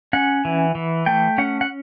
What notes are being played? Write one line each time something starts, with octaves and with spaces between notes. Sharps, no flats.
C#4 F#5
E3
E3
A3 G5
C#4 F#5
F#5